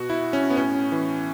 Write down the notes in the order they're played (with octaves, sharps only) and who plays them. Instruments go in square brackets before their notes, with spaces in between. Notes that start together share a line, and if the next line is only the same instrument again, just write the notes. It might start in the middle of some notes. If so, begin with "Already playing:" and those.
Already playing: [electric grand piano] B2 F#4
E4
C#4
B3
A2 C#4
E3